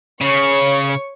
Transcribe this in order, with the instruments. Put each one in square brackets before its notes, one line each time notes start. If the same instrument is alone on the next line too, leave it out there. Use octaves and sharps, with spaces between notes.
[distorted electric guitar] C#3 [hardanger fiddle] C#5 C#6